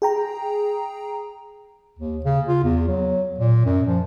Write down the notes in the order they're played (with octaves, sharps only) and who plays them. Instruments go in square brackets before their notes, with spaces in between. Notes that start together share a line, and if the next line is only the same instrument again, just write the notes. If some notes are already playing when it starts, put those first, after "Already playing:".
[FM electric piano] G#4 G5 A#5
[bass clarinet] D#2
C#3
F4
E2
F#3
A#2
F#2
F3